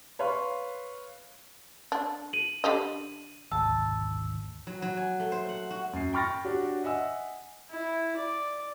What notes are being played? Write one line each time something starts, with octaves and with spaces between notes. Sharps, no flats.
B4 C#5 F5 C6
D4
D#7 F#7
D3 G4 D#5
G#1 D2 A5 E6
F#3
F#3
G#5
A3
C5
F#5
F#4
F#2 C7
G5 B5 C#6 F6 A6 A#6
D4 F#4 G4 C#5
D#5 E5 F#5 G#5 E6
E4
D5